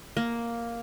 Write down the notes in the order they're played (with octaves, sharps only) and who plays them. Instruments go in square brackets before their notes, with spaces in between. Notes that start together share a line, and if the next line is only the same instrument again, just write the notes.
[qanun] A#3